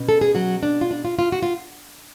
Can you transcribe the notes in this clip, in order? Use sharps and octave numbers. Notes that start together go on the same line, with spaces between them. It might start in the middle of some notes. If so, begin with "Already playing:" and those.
Already playing: B2 C#4
A4
G#4
F#3 F#4
D4
F4
D4
F4
F4
F#4
F4